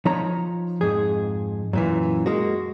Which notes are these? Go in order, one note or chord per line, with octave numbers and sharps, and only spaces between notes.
F3 D#4 C#5 A#5
F2 G#2 G#4
F#2 A#2 E3
G#3 A#3 F#4